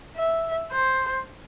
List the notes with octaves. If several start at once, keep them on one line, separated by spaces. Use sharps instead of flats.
E5
C5